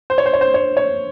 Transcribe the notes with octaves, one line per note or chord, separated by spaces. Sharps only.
C5
C#5
C5
C#5
C5
C#5
C#5